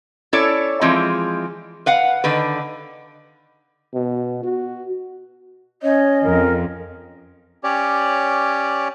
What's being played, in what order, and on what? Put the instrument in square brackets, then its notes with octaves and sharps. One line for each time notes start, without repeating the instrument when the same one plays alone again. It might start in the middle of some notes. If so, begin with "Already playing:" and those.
[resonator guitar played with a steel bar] C#4 E4 A4 C#5 D5
E3 F3 G#3 C4
B4 F5 F#5
D3 D#3 B4
[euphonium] B2
F#4
[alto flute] C#4 [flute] C#5 [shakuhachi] D#5
[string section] F2 [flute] A#4
[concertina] C#4 G4 C#5 D5